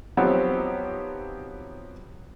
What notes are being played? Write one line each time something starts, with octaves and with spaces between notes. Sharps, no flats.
F3 F#3 B3 C4 D#4 G4